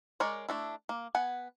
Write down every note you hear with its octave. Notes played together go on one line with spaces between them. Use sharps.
G#3 A#4 C#5 D5
A3 D4 E4
A#3
B3 F#5 G#5